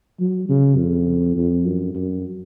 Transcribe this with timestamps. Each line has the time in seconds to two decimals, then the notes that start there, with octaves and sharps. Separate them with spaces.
0.20 F#3
0.49 C#3
0.78 F2
1.37 F2
1.65 F#2
1.94 F#2